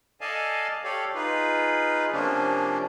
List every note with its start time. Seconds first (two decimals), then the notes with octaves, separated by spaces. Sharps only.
0.21 A4 D5 D#5 F5 G#5 A5
0.84 G4 A4 C#5 D5 F5
1.15 D#4 F4 G#4 B4
2.12 C3 F3 A#3 C#4 D4